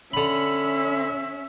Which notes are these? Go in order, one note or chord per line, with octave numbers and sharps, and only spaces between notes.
D3 C#4 E5 B5